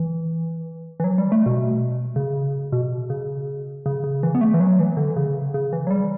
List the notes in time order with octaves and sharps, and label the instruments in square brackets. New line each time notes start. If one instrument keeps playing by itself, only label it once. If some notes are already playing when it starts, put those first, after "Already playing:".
Already playing: [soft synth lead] E3
E3
F#3
G3
A3
B2
C#3
B2
C#3
C#3
C#3
E3
B3
A3
E3
F#3
E3
D3
C#3
C#3
E3
F#3
G3